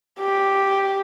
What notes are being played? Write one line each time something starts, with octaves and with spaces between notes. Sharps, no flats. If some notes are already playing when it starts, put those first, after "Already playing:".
G4